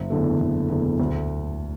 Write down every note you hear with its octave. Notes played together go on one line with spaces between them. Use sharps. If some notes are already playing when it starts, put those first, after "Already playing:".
Already playing: F#1
E2 D3 A3
F#1
E2 D3 A3
D2